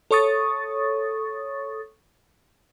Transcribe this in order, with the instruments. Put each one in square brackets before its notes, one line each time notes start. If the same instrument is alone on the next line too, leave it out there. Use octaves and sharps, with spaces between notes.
[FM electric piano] A4 C#5 C#6 D#6 A6